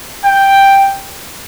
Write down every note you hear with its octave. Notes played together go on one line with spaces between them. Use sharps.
G5